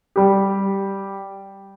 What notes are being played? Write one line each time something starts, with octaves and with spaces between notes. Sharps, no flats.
G3 G4